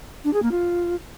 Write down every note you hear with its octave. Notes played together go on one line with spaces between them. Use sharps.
D4
G#4
A#3
F4